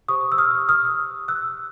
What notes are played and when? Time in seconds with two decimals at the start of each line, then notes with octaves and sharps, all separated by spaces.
0.09 G4 C5 C#6 D#6
0.32 E6
0.38 D#6 F6
0.69 D#6 F6
1.28 E6 F#6